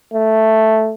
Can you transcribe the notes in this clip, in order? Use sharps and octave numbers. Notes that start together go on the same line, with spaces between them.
A3